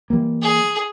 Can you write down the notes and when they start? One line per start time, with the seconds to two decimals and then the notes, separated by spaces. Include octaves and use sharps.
0.10 E3 G3 A#3
0.42 G#4